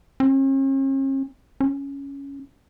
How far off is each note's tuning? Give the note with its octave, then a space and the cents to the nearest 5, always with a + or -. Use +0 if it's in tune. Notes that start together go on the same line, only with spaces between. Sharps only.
C#4 -45
C#4 +5